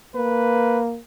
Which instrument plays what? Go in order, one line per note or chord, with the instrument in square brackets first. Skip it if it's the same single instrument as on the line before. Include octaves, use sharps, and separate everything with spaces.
[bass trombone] A#3 [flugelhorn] B4